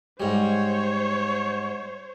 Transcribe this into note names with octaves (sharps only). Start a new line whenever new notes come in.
G#2 G3 C5 C#5